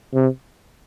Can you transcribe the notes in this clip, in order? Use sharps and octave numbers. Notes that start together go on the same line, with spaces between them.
C3